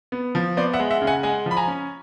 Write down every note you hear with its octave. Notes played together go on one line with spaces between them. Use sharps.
B3
F3
B3 C5 D5
E5 F#5
G#3
E5 F#5
C#3
F#5 G#5
G#3 F#5 G#5
F3
B5
G#5 A#5
C#4